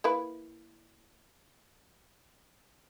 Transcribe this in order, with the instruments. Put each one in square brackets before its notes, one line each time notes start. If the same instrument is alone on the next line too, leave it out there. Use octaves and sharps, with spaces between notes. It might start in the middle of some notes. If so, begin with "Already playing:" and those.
[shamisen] A#3 E4 B4